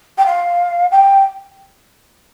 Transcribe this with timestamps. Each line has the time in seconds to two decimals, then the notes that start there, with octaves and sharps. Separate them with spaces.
0.18 G5
0.26 F5
0.91 G5